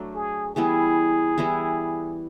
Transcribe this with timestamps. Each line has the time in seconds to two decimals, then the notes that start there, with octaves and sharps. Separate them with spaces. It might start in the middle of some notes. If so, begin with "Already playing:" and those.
Already playing: F#3 A3 D4
0.14 G#4
0.55 E3 G3 B3 E4 G#4
1.38 E3 G3 B3 E4